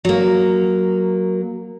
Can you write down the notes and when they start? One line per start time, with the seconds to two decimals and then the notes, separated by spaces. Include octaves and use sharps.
0.05 F#3 A#3